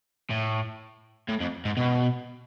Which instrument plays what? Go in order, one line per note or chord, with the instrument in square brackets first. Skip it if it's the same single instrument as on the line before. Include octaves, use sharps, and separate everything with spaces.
[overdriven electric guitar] A2
A2
F2
G#2
B2